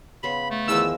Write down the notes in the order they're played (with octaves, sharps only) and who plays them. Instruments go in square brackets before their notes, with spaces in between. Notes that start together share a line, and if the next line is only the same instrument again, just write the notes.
[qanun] C#3 B3 C6 [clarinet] B5
[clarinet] A3
[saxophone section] E2 [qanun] D#3 F3 [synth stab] E6